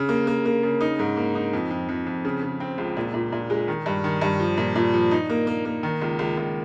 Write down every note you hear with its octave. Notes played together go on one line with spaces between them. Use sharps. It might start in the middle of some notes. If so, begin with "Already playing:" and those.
Already playing: C#3
A#3
A#3
A#3
C#3
D#4
G#2
A#3
D#4
F2
F2
F2
F2
C#3
C#3
C4
C#2
A#2
A#2
A#2
G#3
D#3
G2
D#3
G2
F3
A#2
A#2
F3
D#4
A#3
A#3
A#3
D#3
C#2
C#2
C#2